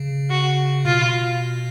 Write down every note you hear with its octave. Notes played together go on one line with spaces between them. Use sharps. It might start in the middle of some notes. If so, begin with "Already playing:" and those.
Already playing: C#3
F#4
B2 F4